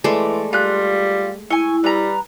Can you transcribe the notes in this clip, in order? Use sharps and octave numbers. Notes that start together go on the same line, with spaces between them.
E3 G#3 A3 D5 C6
G3 F4 F#6
E4 G#5 C#6
G3 B4 A#5